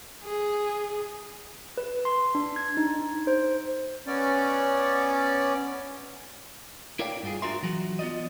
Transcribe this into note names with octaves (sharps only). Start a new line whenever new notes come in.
G#4
B4
C6
D4
G#6
D#4
C5
B3 C#4 D5
E4 A#4 C#5 D5 F5 G5
G2 F4 G#4
D4 F4 F#4 A#4 E5 C6
E3 F#3 F#4
B3 F4 D5 D#5